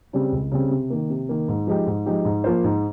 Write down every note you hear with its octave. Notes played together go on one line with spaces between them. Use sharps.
C#3 G3 C4
C#2
C#3 G3 C4
C3
D#3 A#3
C3
D#3 A#3
G#2
F3 G#3 D#4 G4
G#2
F3 G#3 D#4 G4
G#2
F3 A#3 F4 C5
G#2